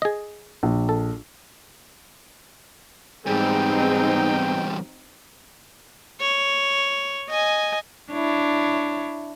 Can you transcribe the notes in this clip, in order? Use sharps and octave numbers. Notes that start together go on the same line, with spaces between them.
G#4 D#5
A#1
A4
E2 G#2 G3 B3 C4 D#4 G#4 G5
C#5
D#5 G#5
D4 E4 C#5